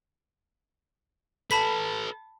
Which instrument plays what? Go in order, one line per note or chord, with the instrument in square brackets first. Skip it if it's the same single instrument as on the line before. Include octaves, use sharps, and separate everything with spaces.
[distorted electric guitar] A4 B4 [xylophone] A5 B5 B6